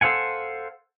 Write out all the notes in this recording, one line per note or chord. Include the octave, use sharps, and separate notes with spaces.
A4 C5 F5 F#5 G#5